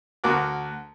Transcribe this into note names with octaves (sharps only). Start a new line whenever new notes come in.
D2 F#4 A#4 D6 F#6